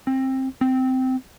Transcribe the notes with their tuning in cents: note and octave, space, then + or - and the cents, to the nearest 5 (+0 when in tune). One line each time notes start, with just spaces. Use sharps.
C4 +15
C4 -15